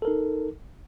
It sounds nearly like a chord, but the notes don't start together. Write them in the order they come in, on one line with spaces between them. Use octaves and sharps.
A4 A#4 D#4